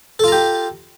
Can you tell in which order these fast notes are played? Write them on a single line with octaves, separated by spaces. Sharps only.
A4 F4 A#5 G4